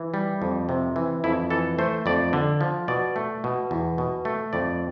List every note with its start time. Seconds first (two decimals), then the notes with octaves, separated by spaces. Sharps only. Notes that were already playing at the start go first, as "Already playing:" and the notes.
Already playing: E3
0.14 G3
0.42 F2
0.69 C3
0.96 E3
1.24 F2 E4
1.50 E3 A4
1.79 A3 C5
2.06 F2 D5
2.33 D3
2.61 F3
2.88 B2 D5
3.16 A3
3.44 B2
3.71 E2
3.98 B2
4.25 A3
4.53 F2 D5